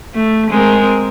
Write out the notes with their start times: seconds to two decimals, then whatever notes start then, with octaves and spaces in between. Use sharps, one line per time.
0.15 A3
0.50 G#3 C4 A#4